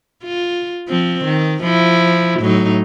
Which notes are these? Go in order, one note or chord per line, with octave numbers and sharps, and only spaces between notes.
F4
F3 C4
D#3
F3 E4
A2 F#3 D#4